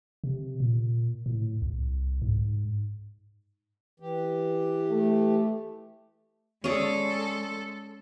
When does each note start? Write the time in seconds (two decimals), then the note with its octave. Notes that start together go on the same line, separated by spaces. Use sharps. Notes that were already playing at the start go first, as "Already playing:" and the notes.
0.24 C3
0.60 A#2
1.26 A2
1.62 C2
2.22 G#2
4.00 E3 G4
4.90 A3
6.64 G#3 C#4 G#4 A4 D5